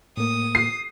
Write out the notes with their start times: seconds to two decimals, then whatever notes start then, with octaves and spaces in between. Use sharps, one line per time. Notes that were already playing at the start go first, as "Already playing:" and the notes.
0.17 A2 A#3 D#6
0.55 C7